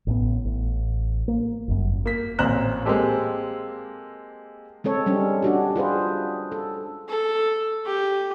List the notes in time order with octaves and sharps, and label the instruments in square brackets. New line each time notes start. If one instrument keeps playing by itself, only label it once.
[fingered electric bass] A1 A2 B3
A1
A#3
G1 F#2
[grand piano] A#3 B6
A1 A#2 C4 A#5 F#6 E7
G#3 A#3 C4 G4 A4
[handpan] G#3 C4 A4 C#5
G3 G#3 C#4 D4
D4 F#4 G4
F4 G#4 B4 C5
A4
[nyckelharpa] A4
G4